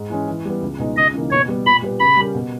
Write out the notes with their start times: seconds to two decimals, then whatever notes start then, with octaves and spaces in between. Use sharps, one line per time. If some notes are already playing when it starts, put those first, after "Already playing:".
Already playing: G#2
0.10 E3 G#3 C#4
0.28 E3
0.45 G3 B3
0.62 C#2
0.79 B2 G#3 D#4
0.96 C#2 D#5
1.14 C#3 E3 A#3 D#4
1.31 B2 C#5
1.48 G3 B3
1.66 A#2 B5
1.82 G3 B3 G4 B4
2.00 C#3 B5
2.17 G3 C#4 G4 A#4
2.34 B2